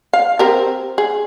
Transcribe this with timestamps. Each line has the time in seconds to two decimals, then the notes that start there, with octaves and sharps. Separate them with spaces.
0.13 F5
0.39 C4 G4 A#4
0.98 G#4